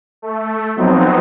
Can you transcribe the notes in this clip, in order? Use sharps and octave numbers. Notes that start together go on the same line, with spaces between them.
A3
F3 F#3 B3 C4 D#4